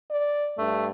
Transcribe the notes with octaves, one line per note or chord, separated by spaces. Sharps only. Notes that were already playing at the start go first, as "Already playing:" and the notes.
D5
G2 A3